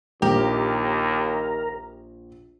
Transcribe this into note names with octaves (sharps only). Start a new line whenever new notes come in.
A#1 D#2 G4 A#4